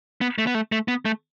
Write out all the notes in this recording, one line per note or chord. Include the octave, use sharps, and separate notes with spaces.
B3
A3
B3
A3
A3
B3
A3